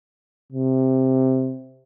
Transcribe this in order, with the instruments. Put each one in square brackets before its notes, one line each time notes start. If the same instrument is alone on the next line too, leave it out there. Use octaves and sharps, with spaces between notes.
[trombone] C3